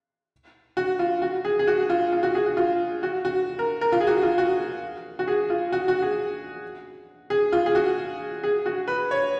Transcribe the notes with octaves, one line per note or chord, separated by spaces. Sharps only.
F#4
F4
F#4
G#4
G#4
F#4
F4
F4
F#4
G#4
F#4
F4
F#4
F#4
A#4
A#4
F4
G#4
F#4
F4
F#4
F#4
G#4
F4
F#4
F#4
G#4
G#4
F4
G#4
F#4
G#4
F#4
B4
C#5